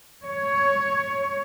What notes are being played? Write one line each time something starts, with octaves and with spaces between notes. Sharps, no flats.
C#5